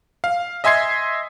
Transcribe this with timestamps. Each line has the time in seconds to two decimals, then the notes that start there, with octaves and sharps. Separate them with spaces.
0.24 F5
0.64 D#5 E5 G#5 C6 G#6 C7